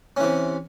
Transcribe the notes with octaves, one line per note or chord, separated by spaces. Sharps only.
C3 E3 C#4